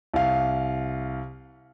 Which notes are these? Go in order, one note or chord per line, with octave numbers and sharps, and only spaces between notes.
C2 F5